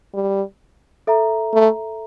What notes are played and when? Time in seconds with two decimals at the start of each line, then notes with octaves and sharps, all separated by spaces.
0.14 G3
1.07 A4 E5 A#5
1.53 A3